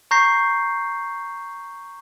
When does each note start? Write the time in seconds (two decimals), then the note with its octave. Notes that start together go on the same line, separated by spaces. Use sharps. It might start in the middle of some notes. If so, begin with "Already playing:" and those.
0.11 A#5 C#6 G6 A#6 C7